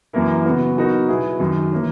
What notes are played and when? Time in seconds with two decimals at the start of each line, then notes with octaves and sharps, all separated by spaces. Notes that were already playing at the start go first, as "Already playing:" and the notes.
0.13 F#2 E3 A#3 E4 A#4
0.45 C#3 F#3 B3 F#4
0.77 F#3 B3 D#4 F#4 A#4
1.08 B2 F#3 B3 E4 G#4
1.40 F#2 D#3 F#3
1.72 E3 A#3 C#4